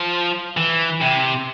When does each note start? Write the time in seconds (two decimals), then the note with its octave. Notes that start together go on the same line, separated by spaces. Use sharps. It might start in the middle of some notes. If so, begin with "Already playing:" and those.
Already playing: F3
0.57 E3
1.01 C3